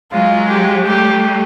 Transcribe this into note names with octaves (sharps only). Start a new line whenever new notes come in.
F#3 G#3 F4
G4
G3 A3 G4